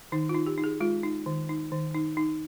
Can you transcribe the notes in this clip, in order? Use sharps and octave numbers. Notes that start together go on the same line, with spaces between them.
D#3 D#4
F4
D#4
G4
D#4
G#4
G#3 F4
D#4
D#3
D#4
D#3
D#4
D#4